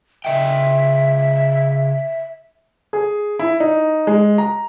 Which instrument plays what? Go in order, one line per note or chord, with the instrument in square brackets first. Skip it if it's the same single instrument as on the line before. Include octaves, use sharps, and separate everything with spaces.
[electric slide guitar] C#3 D#5 G5 [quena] E5
[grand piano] G#4
E4
D#4
G#3
A#5